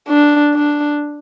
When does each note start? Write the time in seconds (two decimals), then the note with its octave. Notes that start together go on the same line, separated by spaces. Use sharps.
0.09 D4
0.55 D4